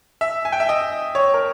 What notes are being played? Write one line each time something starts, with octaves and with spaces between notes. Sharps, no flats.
E5
G#5
G5
E5
D#5
C#5
A#4